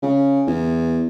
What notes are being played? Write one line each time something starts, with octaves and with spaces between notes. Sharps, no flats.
C#3
E2